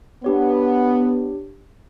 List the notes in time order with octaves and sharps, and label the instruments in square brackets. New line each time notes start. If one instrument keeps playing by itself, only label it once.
[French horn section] B3 [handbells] D4 G4 C#5